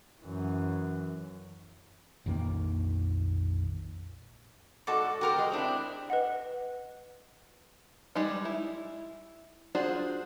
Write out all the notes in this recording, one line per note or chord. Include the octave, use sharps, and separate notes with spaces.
F#2 E3
A#1 F2 D#3 A#3
G#2 F#4 A4 D5
F#4 G4 A#4 C5 G5
G#3
C4 D4 E4
B4 D#5 F#5
G3 G#3 D#4
E4
D4 F4 F#4 G#4 C5